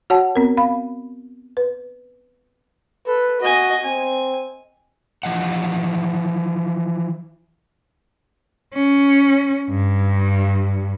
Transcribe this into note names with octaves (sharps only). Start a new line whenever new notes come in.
F#4 C#5 F#5 A5
B3 C4 A#4
F5 B5
B4
A4 B4
F#4 D#5 G#5
C4 G#5
E3 F3 D#5 F#5
C#4
G2